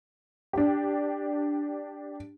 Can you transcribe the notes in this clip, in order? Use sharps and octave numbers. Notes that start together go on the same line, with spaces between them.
D4 G4